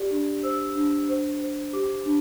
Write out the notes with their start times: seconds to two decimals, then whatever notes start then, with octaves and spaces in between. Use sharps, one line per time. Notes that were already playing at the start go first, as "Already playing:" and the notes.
Already playing: G4 D5
0.10 D4
0.43 C5 E6
0.75 D4
1.09 C5
1.41 C5
1.73 G4 D6
2.06 D4